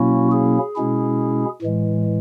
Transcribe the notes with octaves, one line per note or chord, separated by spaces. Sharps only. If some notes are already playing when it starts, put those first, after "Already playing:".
Already playing: B2 F#3 A#3 C#4 E4 F#4
G#4
B2 G#3 C#4 E4
A2 E3 G#3